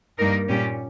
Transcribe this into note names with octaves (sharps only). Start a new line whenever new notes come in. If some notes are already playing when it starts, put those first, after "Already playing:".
G2 G3 A#3 D#4 A#4
A#2 G3 C#4 G4